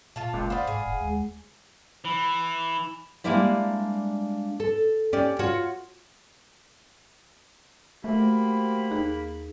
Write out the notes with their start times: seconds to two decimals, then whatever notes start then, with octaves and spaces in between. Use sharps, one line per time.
0.16 A#2 F4 A5
0.33 F#1 C#2 A#2 D6
0.50 C5 D5 F5 F#5 B5 D#6
0.67 G#2 G#4
0.86 F1 F#5
1.00 D#2 G#3
2.05 E3
3.24 G3 G#3 A#3 D4 E4 D5
4.60 A4
5.13 C#4 G4 D5
5.39 F4 F#4 C#5
8.04 A3 A#3 F#4 G4 C5 B5
8.91 D#2 D#4 G#4